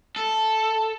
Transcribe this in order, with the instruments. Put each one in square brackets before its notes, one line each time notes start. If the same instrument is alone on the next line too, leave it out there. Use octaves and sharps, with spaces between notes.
[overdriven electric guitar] A4